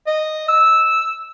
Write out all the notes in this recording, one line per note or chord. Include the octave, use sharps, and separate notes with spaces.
D#5
E6